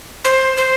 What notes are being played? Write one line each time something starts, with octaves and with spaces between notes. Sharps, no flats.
C5
C5